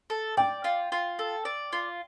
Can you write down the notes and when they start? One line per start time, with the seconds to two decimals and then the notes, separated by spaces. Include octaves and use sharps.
0.10 A4
0.37 D5 G5
0.64 F4
0.92 F4
1.19 A4
1.45 D5
1.73 F4